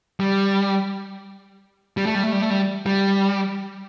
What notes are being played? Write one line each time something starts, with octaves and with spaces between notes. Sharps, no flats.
G3
G3
A3
G3
A3
G3
A3
G3
G3